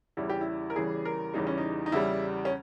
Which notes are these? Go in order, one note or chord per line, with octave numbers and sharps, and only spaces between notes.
E2 C#3 E3 G3 E4
G4
E4
A#4
E2 C#3 E3 G3 G#4
A#4
E2 C#3 E3 G3 D#4
C#4
D#4
D#4
E2 C#3 E3 G3 E4
C#4